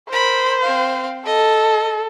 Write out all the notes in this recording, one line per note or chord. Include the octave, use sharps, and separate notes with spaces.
A#4 C5 B5
C4 F5
A4 D#5